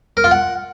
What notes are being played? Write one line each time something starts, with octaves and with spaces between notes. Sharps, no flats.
A#4
F4
F#5